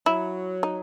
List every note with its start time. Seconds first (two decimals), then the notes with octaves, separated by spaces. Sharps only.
0.06 F#3 E4
0.63 D#4